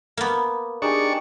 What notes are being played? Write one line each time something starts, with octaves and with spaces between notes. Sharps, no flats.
A#3 B3
D4 D#4 G4 G#4 C#6